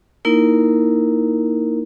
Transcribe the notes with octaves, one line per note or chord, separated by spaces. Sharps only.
A#3 D#4 E4 A#4